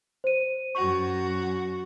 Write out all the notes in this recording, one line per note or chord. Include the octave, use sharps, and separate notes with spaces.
C5 D#7
F#2 F#4 C#6